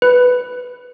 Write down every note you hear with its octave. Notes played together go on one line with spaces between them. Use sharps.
B4